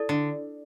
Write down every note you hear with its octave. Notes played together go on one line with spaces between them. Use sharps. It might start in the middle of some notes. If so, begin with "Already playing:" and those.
Already playing: E4 A4 D5
D3